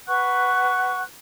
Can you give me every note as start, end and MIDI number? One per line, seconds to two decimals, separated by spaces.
0.08 1.02 71
0.08 1.02 78
0.08 1.02 85
0.08 1.02 90